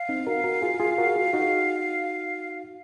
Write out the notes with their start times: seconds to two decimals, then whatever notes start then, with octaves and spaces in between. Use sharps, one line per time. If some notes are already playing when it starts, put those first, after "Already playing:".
Already playing: F5
0.09 C4 D#4
0.27 F#4 A#4
0.44 F#4 A#4
0.62 F4 G#4
0.80 F4 G#4
0.98 F#4 A#4
1.15 F4 G#4
1.33 D#4 F#4